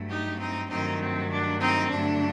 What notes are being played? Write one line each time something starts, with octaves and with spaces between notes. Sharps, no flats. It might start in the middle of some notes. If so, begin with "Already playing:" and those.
Already playing: G2 F#3 A3
D#4 G4
C4 D#4
G2 D#3 F#3 A3 C4 D#4
C4
D4
C4 D#4
G2 D3 F#3 A3 D4